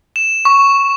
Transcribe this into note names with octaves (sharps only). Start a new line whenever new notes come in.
E7
C#6